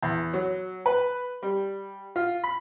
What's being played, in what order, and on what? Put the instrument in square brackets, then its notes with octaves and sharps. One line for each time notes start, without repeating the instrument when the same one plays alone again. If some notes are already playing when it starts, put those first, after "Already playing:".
[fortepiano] E2
F#3
B4
G3
F4
B5